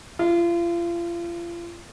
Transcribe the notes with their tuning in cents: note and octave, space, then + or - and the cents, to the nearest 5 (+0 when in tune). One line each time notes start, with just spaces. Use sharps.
F4 -35